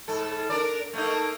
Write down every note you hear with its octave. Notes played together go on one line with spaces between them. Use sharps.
G#2 A4
D4 A#4 D5
A3 A#3 D#4